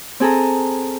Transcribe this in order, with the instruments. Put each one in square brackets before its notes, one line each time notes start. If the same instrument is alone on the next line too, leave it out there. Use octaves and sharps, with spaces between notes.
[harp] C4 G#4 A4 A#5